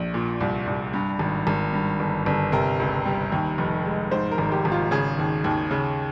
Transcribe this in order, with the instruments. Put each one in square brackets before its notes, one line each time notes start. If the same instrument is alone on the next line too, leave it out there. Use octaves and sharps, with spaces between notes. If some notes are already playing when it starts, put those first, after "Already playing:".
Already playing: [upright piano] A#1
A#2
C2
C2
G2
G#1
G#1
G2
G1
G1
C3 A#4
C#2
G3
D#2
F1
G#3
G#2 C5
A#4
G#1
G4
G#1
F4
C#3 G#4
D#2
D#2
C#3